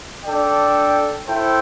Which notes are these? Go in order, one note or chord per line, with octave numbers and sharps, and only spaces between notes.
D4 A4 D5 G5
E4 A4 C5 G5